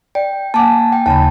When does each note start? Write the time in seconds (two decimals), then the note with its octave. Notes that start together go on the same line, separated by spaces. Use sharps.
0.15 D5 G5
0.54 A#3 F#5 G#5 A5 D6
0.93 G5
1.06 D#2 C#3 A5 B5